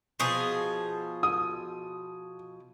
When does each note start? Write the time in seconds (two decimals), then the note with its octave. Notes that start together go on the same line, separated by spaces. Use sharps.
0.20 B2 F3 G#4
1.23 D#6